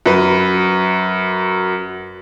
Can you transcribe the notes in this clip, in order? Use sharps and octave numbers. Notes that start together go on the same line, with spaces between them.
F#2 B4